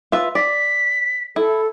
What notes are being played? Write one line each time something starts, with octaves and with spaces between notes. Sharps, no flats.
F4 B4 E5
D5 B6
E4 A4